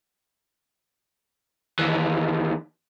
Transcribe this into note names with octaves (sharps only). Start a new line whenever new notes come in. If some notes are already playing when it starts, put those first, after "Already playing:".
D#2 E3